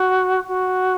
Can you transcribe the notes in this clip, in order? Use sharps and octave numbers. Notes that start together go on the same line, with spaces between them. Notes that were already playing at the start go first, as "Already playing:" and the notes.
Already playing: F#4
F#4